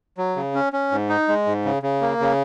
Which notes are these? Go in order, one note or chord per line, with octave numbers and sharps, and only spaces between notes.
F#3
C#3
C#4
C#4
G#2
D#4
G#3
G#2
C#3
C#3
A#3
C#3